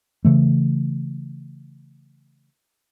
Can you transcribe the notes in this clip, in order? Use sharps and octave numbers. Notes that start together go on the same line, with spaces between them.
C#3 E3 A3